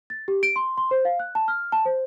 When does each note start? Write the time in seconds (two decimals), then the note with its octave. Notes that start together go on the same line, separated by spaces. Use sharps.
0.10 A6
0.28 G4
0.43 D7
0.56 C6
0.78 C6
0.91 C5
1.05 F5
1.20 F#6
1.35 A5
1.48 F6
1.72 A5
1.85 C5